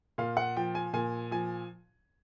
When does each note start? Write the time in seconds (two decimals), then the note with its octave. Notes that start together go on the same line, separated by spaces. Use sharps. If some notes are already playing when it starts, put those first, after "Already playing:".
0.18 A#2 F5
0.37 F#5
0.56 F3 G5
0.75 G#5
0.93 A#2 G#5
1.31 F3 G#5